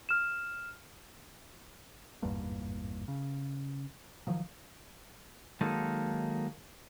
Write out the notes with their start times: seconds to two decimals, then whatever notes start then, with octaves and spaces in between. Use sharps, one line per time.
0.09 F6 E7
2.22 G#1 E2 G2 A#2
3.08 C#3
4.27 D#3 F3 F#3
5.61 D#3 F#3 G#3 A#3 D#4 A4